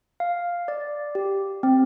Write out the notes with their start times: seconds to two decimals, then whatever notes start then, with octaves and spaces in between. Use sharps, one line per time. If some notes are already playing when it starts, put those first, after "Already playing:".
0.20 F5
0.68 D5
1.15 G4
1.63 C4